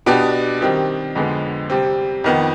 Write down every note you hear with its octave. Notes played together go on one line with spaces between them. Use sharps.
B2 B3 D4 G4
D#3 G3 C4 G4
F2 D3 G#3 B3
C3 G3 C4
F2 D#3 B3